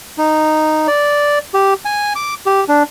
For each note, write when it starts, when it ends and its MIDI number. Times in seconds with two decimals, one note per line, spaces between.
0.18 0.87 63
0.88 1.39 74
1.54 1.74 67
1.85 2.13 80
2.16 2.34 86
2.46 2.64 67
2.69 2.83 62